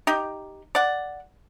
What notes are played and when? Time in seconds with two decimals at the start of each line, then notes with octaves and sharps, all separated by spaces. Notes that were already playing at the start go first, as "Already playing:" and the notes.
0.07 D#4 G4
0.75 D5 F#5